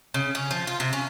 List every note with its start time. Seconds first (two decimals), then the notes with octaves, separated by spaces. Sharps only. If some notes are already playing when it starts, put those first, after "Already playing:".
0.14 C#3
0.35 C#4
0.51 F3
0.67 F4
0.80 C3
0.93 C#4